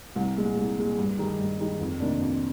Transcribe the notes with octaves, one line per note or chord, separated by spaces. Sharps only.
C2
A#2 G#3
C2
A#2 G#3
G2
D#3 G#3 D#4 G4
G2
D#3 G#3 D#4 G4
F2
C3 D#3 A#3 D4
F2